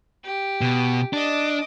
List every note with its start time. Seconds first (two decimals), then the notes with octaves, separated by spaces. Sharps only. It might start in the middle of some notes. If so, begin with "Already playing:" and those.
0.24 G4
0.61 B2
1.13 D4 D#5 D6